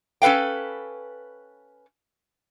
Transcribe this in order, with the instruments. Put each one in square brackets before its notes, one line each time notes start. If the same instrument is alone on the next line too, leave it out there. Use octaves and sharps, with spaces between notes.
[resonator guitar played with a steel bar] C#4 A4 B4 F5 G5